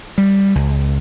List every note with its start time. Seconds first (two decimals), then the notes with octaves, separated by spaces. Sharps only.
0.18 G3
0.55 C#2